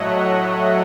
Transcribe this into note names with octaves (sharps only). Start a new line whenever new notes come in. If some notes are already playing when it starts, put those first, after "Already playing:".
Already playing: A2 F#3 A3 C#5 D#5 E5 F#5